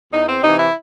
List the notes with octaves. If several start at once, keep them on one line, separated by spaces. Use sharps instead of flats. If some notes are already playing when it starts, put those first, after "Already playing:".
E2 D#4
C4
C3 E3 D#4
E4